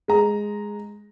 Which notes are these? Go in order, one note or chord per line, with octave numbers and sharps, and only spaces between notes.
G#3 A#5